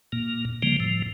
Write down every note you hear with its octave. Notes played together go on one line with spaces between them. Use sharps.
A#2 A#3
C#3 F3 G3 A#3
A2 F3